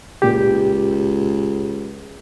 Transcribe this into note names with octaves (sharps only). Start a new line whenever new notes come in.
C#2 A#2 G4